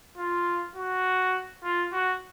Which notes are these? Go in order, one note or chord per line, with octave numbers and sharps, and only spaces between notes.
F4
F#4
F4
F#4